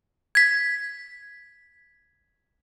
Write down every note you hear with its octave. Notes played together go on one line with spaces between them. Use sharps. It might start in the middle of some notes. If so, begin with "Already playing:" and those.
G#6 B6